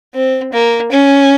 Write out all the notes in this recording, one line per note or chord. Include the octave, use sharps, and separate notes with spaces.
C4
A#3
C#4